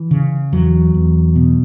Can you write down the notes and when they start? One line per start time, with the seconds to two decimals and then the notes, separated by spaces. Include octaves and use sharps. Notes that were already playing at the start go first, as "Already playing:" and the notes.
Already playing: E3
0.11 C#3
0.52 E2 F#3
0.94 E2
1.36 B2